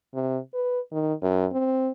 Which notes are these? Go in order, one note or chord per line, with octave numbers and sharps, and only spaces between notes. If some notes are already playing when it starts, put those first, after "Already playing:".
C3
B4
D#3
F#2
C4